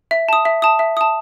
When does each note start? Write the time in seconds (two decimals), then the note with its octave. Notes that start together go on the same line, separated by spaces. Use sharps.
0.11 E5
0.29 A5 D#6
0.45 E5
0.62 A5 D#6
0.79 E5
0.97 A5 D#6